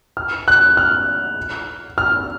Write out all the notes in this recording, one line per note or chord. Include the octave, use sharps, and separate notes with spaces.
F6
F#6
F6
F6